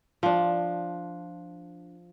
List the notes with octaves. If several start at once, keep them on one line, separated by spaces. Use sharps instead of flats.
F3 D4